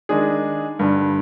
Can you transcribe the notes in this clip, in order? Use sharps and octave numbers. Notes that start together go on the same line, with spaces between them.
D#3 G#3 D4 G#4
G2 D3 G3